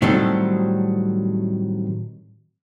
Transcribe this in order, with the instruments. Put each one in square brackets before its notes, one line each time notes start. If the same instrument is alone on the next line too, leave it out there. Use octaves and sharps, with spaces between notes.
[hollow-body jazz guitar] A2 D#3 F#3 G3 C4 A4